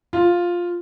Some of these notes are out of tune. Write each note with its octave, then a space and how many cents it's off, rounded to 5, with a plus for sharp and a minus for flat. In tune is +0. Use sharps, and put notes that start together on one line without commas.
F4 +5